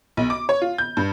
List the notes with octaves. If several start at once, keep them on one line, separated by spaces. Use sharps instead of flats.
B1
D6
C#5
F4
G6
G2